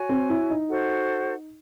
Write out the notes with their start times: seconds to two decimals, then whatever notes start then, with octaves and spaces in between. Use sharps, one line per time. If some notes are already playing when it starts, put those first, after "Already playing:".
Already playing: F#4 C#5 G#5
0.09 C4
0.30 E4
0.50 D#4
0.70 F#4 A4 C5 F#5